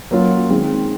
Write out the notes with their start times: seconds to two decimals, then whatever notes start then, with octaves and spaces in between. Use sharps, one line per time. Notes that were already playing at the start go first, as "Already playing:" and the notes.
0.11 F#3 A#3 C#4 F4
0.50 D#3 G#3 C4